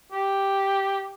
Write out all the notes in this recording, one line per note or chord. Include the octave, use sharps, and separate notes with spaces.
G4